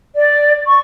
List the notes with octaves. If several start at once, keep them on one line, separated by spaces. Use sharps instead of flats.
D5
C#6